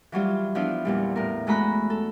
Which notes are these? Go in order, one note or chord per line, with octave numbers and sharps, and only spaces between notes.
E3 F#3 G3 F4
F3 B3 D4 E4 F4
E2 A#2 G3
A2 A#4
G#3 A3 F#4 A#5 B5 F#6
A4